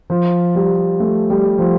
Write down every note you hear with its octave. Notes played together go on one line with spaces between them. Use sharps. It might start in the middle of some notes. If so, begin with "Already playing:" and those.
F3
G3
A3
G3
F3